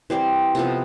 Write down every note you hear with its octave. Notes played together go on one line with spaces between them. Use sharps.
E3 G3 C4 C5
C3 F3 B3 A4